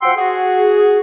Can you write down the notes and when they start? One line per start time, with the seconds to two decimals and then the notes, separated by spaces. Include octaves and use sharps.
0.02 F3 F#4 F#5 G5 C6 E6
0.17 F#4 G#4